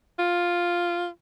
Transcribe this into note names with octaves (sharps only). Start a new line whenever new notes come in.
F4